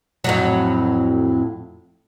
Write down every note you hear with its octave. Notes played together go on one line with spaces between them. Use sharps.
F2 A2 F#3